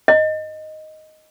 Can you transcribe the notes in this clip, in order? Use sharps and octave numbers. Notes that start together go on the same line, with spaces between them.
D#5